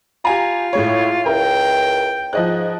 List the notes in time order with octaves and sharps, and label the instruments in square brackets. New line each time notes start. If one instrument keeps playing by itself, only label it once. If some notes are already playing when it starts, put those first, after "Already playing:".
[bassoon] F4 [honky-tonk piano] G4 G#5 A#5
[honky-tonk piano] A2 G#3 C#5
[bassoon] C#2 [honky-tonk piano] E4 A#4 [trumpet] G5
[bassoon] G#2 [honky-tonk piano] F3 D#5 F#6